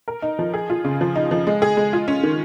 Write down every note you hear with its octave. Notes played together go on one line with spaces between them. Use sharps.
A#4
D#4
F3
G#4
F4
C#3
F3
D#4
F3
G#3
G#4
G#3
F4
C#4
D#3